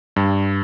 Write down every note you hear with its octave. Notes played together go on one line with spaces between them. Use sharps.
G2